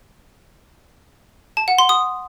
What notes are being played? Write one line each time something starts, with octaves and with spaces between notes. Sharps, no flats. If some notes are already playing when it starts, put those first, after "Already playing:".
A5
F#5
C6
D#6